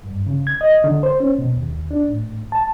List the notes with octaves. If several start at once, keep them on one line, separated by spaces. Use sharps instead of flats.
G2
C#3
G#6
D#5
D3
C5
C#4
B2
D#2
D4
A2
A5